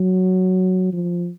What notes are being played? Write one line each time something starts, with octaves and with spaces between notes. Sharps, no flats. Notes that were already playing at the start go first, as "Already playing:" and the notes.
Already playing: F#3
F3